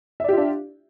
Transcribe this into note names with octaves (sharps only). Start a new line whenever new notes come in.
D4 F4 G4 D5 E5